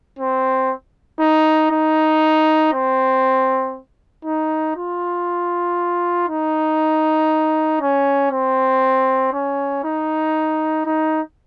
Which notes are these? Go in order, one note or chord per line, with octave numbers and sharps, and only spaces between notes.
C4
D#4
D#4
C4
D#4
F4
D#4
C#4
C4
C#4
D#4
D#4